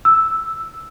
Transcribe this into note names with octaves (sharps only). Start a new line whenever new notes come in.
E6